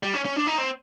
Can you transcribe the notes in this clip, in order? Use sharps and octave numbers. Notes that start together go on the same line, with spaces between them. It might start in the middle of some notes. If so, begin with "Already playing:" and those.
G3
C#4
C#4
D4
D#4
C4